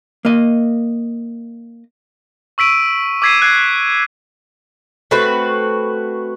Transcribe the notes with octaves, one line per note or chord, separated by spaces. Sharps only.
A#3 D#5
C#6 E6 B6 D7 D#7
D6 E6 G#6 B6 C7 D#7
F#6 G#6 C7
A3 C4 F#4 B4